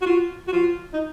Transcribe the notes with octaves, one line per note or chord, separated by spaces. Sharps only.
F#4
F4
F#4
F4
D#4